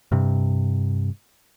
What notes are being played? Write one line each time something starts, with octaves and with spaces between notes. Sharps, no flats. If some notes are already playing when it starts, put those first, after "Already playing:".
G2 C3